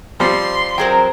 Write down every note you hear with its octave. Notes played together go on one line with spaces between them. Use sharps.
F3 G3 C4 C6
F#3 G#4 A#4 C5 G5